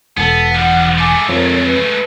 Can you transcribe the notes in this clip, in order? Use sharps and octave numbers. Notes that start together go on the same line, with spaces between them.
E1 B3 A4
F3 G3 F#5
G#3 A3 G#5 D6
F2 A#4 C#5
B4